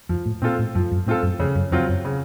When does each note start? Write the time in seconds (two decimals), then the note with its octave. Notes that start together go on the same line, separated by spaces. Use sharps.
0.09 F2 F3
0.26 A2
0.42 A#2 C4 F4 A4
0.59 A2
0.75 F#2 F3
0.91 F#2
1.06 A2 C4 F4 A4
1.23 F#2
1.39 F2 C#3
1.55 F#2
1.71 F2 F#3 C4 F4
1.89 F#2
2.05 C#3